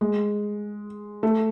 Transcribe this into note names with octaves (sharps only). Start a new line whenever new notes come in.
G#3
A3